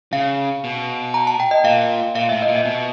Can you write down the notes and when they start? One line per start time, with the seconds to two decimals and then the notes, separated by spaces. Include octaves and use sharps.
0.13 C#3 F5
0.64 B2
1.14 A#5
1.27 A5
1.40 G5
1.51 D#5
1.64 A#2 F5
2.15 A#2 F5
2.29 A2 E5
2.42 D#5
2.48 A#2
2.56 E5
2.65 B2